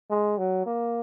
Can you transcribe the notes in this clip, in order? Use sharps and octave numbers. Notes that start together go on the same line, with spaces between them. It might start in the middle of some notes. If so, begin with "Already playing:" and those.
G#3
F#3
A#3